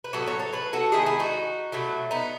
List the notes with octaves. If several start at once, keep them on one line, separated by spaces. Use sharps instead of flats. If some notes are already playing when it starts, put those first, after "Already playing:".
B4
A2 F#3 B3 F#4 A4
A4 C#5
A4 C#5
G#4 B4
F#4 A4
D#3 G#3 B3 E4 G#4
E4 G#4
D#4 F#4
B2 F#3 A3
B3 D#4